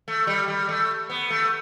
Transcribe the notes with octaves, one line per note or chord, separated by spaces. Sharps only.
A3
G3
G3
A3
B3
A3